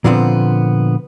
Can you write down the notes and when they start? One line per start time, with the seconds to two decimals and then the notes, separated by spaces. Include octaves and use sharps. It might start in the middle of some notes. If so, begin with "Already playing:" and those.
0.04 A#2 D3 F3 G3 B3 C4